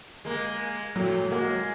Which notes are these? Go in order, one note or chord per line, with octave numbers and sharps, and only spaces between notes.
G#3 A#3
A2 F#3
G#3 A#3 F#4